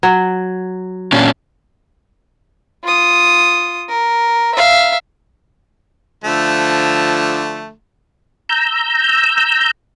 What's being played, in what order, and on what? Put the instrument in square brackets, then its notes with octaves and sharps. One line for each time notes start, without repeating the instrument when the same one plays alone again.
[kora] F#3
[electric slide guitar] A#2 C#4 D4
[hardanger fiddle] F4 D#6
A#4
E5 F5
[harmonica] D3 F3 A3
[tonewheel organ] A#5 E6 G6